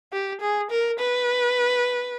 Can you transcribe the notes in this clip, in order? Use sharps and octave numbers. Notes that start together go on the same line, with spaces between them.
G4
G#4
A#4
B4